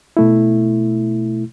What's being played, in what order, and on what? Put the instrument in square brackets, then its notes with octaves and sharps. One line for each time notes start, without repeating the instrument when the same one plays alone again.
[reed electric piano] B2 A3 E4